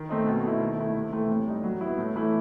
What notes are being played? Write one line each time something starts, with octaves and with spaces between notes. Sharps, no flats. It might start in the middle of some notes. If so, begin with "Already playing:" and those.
Already playing: D#3
A3 C4 D#4
B2
A3 E4
D#3
A3 E4
C3
E3 A3 C4
A2
G3 D#4
F#3
B3 E4
A2
E3 A3 E4